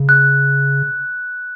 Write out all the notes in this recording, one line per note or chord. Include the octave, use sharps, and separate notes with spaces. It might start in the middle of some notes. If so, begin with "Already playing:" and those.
Already playing: C#3
F#6